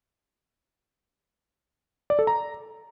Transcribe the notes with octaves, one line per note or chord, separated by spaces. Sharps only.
D5
A4
A#5